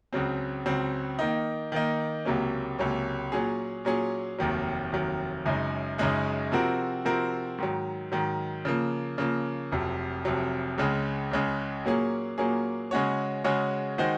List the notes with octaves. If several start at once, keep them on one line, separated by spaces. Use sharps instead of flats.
C#2 C#3 F#3 C4
C#2 C#3 F#3 C4
D#3 A#3 D#4
D#3 A#3 D#4
C#2 C3 F#3 A#3 C#4
C#2 C3 F#3 A#3 C#4
A#2 F#3 C#4 G#4
A#2 F#3 C#4 G#4
F1 D#2 D#3 F#3
F1 D#2 D#3 F#3
F#1 F#2 C#3 G#3 D#4
F#1 F#2 C#3 G#3 D#4
C3 F3 C4 F#4 A#4
C3 F3 C4 F#4 A#4
G#2 D#3 F#3
G#2 D#3 F#3
C#3 F3 A#3
C#3 F3 A#3
F1 F2 C3 F#3
F1 F2 C3 F#3
C#2 C#3 G#3
C#2 C#3 G#3
A#2 F#3 A#3 C#4 G#4
A#2 F#3 A#3 C#4 G#4
C#3 G#3 C#4 F#4 C#5
C#3 G#3 C#4 F#4 C#5
D#3 G#3 D#4 F#4 C5